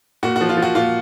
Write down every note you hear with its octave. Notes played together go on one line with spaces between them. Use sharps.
A#2 F#4
F3 F#4
F4
F3
F#4
A#2 F4